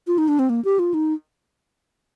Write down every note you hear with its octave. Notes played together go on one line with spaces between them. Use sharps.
F4
D#4
D4
C4
A#3
G4
F4
D#4